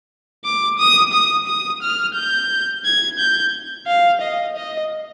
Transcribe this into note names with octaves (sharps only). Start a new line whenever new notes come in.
D6
D#6
D#6
D#6
F6
G6
G#6
G6
F5
D#5
D#5